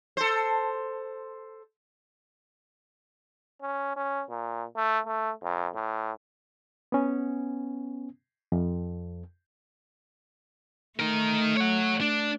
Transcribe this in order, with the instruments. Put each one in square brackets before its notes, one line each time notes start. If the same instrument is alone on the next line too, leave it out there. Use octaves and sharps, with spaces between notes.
[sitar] A4 C5
[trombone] C#4
C#4
A#2
A3
A3
F2
A2
[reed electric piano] B3 C#4
F2
[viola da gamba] A3 [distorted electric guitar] D#4 A#4
[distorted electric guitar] C#5 F#5
D4